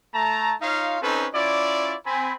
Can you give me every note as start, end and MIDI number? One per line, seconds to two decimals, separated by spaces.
0.14 0.54 57
0.14 0.54 81
0.14 0.54 82
0.62 0.98 63
0.62 0.98 65
0.62 0.98 73
0.62 0.98 77
1.02 1.27 60
1.02 1.27 61
1.02 1.27 63
1.02 1.27 69
1.02 1.27 71
1.02 1.27 72
1.34 1.95 61
1.34 1.95 64
1.34 1.95 65
1.34 1.95 74
2.06 2.34 60
2.06 2.34 80
2.06 2.34 83